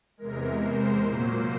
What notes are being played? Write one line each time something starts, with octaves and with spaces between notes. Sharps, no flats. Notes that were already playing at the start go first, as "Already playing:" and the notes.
E2 C3 E3 G#3 A#4
C5
A#2 F#3 A#3